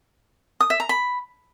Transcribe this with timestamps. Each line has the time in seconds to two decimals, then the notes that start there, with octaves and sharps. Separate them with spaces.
0.60 D#6
0.70 E5
0.80 A#5
0.89 B5